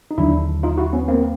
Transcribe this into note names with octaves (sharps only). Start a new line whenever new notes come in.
D#4
D#2 D3 F#3 D4 E4
D#4 F4
E4 F#4
B3 C#4
A#3 C4